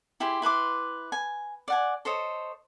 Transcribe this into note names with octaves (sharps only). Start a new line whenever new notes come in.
E4 G4 G#4 C6
E4 B4 C6 D6
G#5
D5 F#5 G#5
A4 C5 C#5 D#5